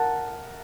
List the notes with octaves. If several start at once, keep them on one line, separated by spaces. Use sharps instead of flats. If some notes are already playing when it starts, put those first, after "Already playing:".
Already playing: A#4 F#5 A5